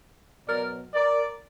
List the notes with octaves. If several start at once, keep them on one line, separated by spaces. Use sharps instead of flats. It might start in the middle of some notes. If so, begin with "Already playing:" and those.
B2 F#3 A#4 D5
A#4 D5